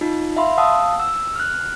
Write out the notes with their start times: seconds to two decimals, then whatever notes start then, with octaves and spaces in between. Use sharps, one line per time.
0.01 D#4 F4
0.36 E5 F5 B5 C6
0.58 F5 F#5 A5 D#6 E6
1.00 E6
1.36 F6 F#6